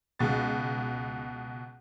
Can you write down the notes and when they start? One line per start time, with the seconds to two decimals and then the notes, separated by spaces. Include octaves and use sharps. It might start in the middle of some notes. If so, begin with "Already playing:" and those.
0.19 C#2 B2 A6